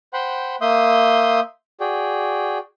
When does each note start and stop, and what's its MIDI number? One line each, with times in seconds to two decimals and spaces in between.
0.13 0.56 72
0.13 0.56 78
0.13 0.56 79
0.13 0.56 83
0.13 0.56 84
0.61 1.40 58
0.61 1.40 76
0.61 1.40 84
0.61 1.40 87
0.61 1.40 91
1.80 2.58 66
1.80 2.58 68
1.80 2.58 74
1.80 2.58 79